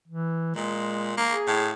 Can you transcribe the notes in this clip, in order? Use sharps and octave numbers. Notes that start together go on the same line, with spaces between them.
E3
A#2 G#3
A#3
G#4
A2